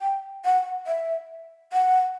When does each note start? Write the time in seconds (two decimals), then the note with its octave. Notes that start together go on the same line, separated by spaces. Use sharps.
0.02 G5
0.45 F#5
0.87 E5
1.73 F#5